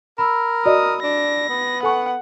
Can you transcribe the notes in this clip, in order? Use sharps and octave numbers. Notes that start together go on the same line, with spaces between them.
A#4 B5 E6
F#4 D5 D#5 D#6
D4 A#6
B3
A4 F#5 G#5 C#6